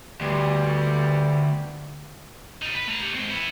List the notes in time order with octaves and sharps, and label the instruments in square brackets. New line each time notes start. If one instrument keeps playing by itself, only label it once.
[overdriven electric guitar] D2 [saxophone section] G2 B2 G3
[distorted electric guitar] G3 D#4
B4
A3 A#5
G4 C#5
G#3 C4
B3 E4